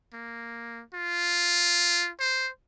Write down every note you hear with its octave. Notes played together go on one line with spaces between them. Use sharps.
A#3
F4
C5